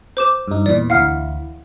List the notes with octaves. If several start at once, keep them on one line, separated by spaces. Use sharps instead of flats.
C5 D6 E7
G2 D#4
E2 A#2 E3 D5
D2 E3 E4 F5 F#5 F6